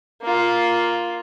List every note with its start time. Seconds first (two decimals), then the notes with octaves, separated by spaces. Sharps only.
0.22 A#3 F4